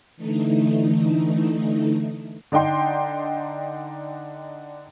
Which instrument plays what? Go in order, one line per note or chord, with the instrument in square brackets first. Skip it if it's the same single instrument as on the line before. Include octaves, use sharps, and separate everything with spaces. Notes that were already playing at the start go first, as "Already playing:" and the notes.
[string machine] D3 E3 A3 D#4
[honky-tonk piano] D3 D4 D#4 G5 C6